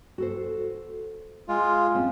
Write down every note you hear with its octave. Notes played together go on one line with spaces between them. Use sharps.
F#4 A4 C5
G#3 F4
C4 C#4